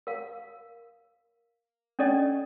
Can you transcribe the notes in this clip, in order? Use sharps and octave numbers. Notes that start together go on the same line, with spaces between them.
A#4 F5
C#4 D4 A4 D5 D#5